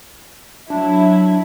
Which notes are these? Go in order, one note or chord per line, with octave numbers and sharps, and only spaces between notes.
F#3 D4 E4